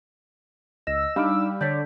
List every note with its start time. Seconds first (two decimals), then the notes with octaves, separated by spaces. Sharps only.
0.87 C#2 D#5 E6 A#6
1.16 G3 D4 D#4 F5 B5 D6 F6
1.61 D3 C#5 D5 G6 B6